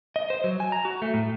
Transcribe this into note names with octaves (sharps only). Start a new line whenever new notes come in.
D#5
C5
F#3
G#5
A#5
F#4
A3
A2